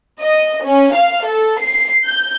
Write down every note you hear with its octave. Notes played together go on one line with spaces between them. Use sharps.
D#5
C#4
F5
A4
C7
G6